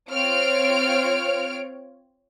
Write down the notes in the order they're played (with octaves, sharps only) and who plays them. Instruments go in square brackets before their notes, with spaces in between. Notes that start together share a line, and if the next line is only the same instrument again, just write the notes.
[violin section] C4 F4 C#5 F6 D7